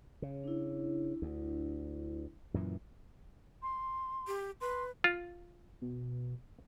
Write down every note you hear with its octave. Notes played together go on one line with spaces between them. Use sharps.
C#3
D4 E4
D2
F#2 A#2 E3
C6
G4
B4 C6
F4
B2